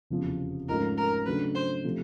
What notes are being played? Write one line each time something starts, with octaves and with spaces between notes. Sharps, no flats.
F1 E2 C#3 F3
G#2 F3 A3 C#4 F4 A#4
A#4
C#3 F#3 A3 D4 B4
C5
C3 F3 A3